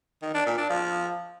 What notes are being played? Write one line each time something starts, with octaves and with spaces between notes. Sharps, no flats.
D#3
D4
A#2
D4
F3